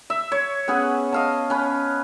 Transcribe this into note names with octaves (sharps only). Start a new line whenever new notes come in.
E5
C#5
B3 C#4 G#4 F#5
D#5 F5 A5
C#4 B4